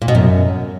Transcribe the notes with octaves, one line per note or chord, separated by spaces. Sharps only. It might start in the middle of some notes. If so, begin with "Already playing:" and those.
A#2
B2
F#2